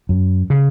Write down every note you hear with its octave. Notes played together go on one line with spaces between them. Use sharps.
F#2
C#3